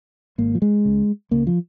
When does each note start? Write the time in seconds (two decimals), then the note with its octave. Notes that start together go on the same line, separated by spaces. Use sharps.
0.38 G#1 G#2 A#3
0.55 F3
0.62 G#3
0.85 C#2 C#3
1.31 C#2 C#3 A#3
1.47 F3